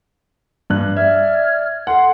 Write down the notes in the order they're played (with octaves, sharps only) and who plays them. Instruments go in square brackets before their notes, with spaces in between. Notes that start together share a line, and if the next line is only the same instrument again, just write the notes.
[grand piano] G2 F#6
[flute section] D5 F6 G#6 [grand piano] E5
[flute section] A4 C6 [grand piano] F#5